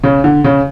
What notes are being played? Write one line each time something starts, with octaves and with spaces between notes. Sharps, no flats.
C#3
D3
C#3